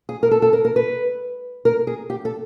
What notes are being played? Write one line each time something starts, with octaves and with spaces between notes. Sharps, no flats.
G#4
A#4
A4
A4
A#4
A#4
B4
A#4
G#4
G4
A4